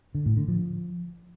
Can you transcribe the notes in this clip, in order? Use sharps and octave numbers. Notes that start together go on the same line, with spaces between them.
D3
A2
D3
F3